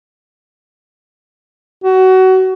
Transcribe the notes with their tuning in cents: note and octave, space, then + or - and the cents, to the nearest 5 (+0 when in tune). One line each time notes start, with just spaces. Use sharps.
F#4 +20